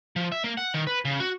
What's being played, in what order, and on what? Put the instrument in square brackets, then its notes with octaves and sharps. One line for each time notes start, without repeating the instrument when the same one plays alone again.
[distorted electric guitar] F3
E5
A#3
F#5
D#3
B4
C#3
F#4